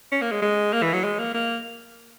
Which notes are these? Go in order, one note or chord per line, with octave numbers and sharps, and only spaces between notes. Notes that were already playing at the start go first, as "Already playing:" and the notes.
C#4
A#3
G#3
G#3
A#3
E3
F#3
G#3
A#3
A#3